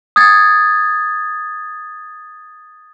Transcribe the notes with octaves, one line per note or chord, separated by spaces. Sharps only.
D#6 G#6 A6